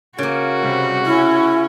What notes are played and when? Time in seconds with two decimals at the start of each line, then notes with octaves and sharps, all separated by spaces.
0.18 C#3 A#3 F#4 A#4
0.62 C3 G3
1.06 C#4 E4